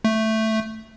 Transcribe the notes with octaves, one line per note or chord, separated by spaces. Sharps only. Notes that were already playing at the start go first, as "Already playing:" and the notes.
A3